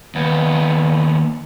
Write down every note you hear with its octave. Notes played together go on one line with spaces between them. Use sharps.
D#2 B3